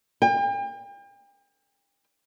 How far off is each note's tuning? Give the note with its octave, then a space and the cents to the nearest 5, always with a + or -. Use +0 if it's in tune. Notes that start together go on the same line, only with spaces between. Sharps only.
G5 +40